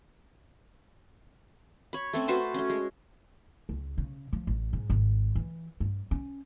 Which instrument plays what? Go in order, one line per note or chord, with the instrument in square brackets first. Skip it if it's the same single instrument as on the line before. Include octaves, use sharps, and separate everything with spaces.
[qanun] C#5 B5
A3 C4 C#4
F#4 B4 C5 A5
A3 C#4
G#3
[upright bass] C#2
C#3
F3
A1
G#2
G#1
E3
G2
C#4